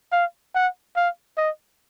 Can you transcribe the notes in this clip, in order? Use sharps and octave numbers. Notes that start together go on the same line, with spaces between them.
F5
F#5
F5
D#5